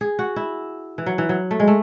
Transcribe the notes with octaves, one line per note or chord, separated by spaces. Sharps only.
G#4
F#4
E4
E3
F#3
E3
F#3
A3
G#3
A3